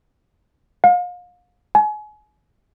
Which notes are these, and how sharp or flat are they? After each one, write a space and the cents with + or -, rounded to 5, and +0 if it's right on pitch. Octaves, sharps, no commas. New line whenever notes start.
F5 +35
G#5 +35